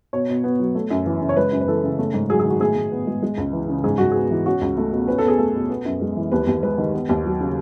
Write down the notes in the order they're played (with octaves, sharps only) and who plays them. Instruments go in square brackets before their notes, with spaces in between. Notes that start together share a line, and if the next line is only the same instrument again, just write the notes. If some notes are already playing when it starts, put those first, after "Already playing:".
[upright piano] B2 C#5
B2
B3
F#3
A3
F#2
E3
C#3
C#5
G#3 B4
F#2
B4
E3 A4
C#3
A3
G#2
F#3 G#4
G#4
D#3
F#4
A2 G#4
A2
B3
G#3
G#3
C#2
E3
C#3
G#2 G#4
G#2 F#4
B3 G#4
E3
C#4 F#4
C#2
A3
B2
C#4 B4
A4
E2 G#4
A3 A4
B2
B3
F#2
G#3
E3
D#2 B4
D#2
G#3 B4
D#3
B3
D#2
F#3
C#3